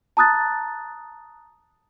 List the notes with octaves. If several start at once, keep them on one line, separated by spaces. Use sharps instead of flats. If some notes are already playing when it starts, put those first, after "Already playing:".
A5 A#5 D#6 F#6 A6